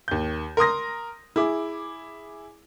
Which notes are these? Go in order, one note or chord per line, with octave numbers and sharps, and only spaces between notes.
D#2 G6
A#4 C6 D#6 A#6
E4 G#4 D6